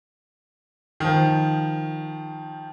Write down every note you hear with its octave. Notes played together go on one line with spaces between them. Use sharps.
D#3 F3